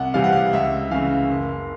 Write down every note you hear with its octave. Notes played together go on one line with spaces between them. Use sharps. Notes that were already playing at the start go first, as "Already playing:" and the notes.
Already playing: C2 F#5
C3 E3 G3 F5
F#5
F5
C#2 E5
C#3 E3 F5
F#1